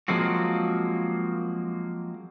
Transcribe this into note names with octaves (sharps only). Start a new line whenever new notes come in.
F3 F#3 G#3 A#3 C4 F#4